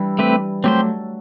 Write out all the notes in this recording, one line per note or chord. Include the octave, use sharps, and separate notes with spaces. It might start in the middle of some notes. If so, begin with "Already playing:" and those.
Already playing: E3 G3 D4
A3 C4 G4 B4
F#3 A3 C4 G4 C5